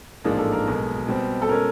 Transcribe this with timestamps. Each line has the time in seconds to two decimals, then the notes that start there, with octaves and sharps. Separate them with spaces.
0.24 A1 G#2 F3 A#3 D4 G#4
0.38 A4
0.52 A#4
0.67 B1 B2 G#3
1.08 B2 G3 C4
1.42 A4
1.49 B2 G#3 C#4 A#4